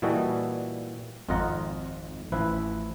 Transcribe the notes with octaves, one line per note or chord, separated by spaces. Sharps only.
A#2 E3 G3 F#4 A4 D#5
G#1 F2 F4 D#5 F#5 A#5
A1 F3 E4 B4